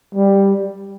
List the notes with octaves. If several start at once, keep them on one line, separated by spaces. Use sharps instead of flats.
G3